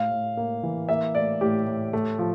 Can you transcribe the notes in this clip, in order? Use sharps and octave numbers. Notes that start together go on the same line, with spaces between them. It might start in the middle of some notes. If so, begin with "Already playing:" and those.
Already playing: A2 F5
A2
A#3
E3
A#3 E5
A2 D5
A2 G4
A2
A3
F3